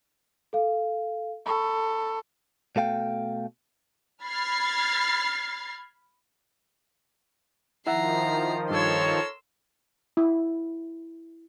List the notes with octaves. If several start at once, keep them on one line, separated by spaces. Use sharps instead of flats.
A4 F5
A4 B5 C#6
B2 A3 F5 G5
B5 F6 G#6 A6 C7
D#3 F3 E4 E5 F#5 A#5 C7
G2 A4 A#4 C#5 C6 E6 G#6
E4